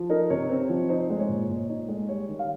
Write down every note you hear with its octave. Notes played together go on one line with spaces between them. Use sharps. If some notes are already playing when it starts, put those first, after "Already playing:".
Already playing: F3
D#4 A#4
C3 C#5
C4
F3
D#4 C5
G#3
C#5
A#2
A#2 C#5
D#4
G#3
G3 C#5
D#3
F5